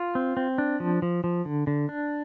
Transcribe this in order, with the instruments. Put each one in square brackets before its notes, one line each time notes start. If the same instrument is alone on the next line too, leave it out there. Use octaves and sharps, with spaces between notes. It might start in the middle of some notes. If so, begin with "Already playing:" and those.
Already playing: [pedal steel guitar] F4
C4
C4
D4
F3
F3
F3
D3
D3
D4